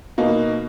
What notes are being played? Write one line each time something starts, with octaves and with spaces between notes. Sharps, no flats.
B2 A#3 D#4